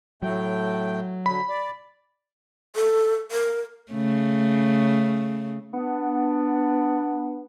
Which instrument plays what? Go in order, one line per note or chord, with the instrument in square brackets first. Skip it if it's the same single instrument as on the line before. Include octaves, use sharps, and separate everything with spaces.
[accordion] A2 A3 G5 [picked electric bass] F#3
[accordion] D3 F#3 [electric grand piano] B5
[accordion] D5
[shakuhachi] A4
A#4
[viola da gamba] C#3 A3
[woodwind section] B3 D4